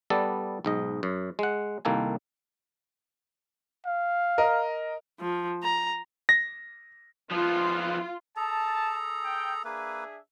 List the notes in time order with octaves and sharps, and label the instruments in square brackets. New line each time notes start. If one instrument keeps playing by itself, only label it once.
[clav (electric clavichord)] G3 B3 A4 D5
B1 G#2 D#5
F#2
G#3 F#5
C2 D#3 A#3 A4 G#5
[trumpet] F5
[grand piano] A#4 D#5
[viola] F3
A#5
[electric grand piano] A#6
[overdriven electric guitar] F3 B3 [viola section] F4
[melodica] G#4 A4 A#5 [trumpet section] A5
[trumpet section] G5
[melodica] A#3 B4 [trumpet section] D4 G#4 E5